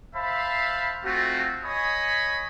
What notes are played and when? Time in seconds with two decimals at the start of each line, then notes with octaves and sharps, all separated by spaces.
0.15 C5 E5 F5 A5 B5
1.05 A3 C4 F4 F#4
1.64 C#5 D#5 G#5 B5 C#6 D#6